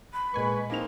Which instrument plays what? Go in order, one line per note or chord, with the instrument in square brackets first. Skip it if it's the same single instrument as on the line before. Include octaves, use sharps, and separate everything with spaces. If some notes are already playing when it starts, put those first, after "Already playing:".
[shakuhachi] B5
[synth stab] A#2 G#5 C#6 [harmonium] G#3 B4
[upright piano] A#3 D#4 F7 [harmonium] C4